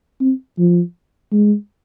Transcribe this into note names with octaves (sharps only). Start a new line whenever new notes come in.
C4
F3
G#3